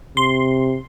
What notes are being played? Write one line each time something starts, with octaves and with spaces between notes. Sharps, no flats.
C3 C6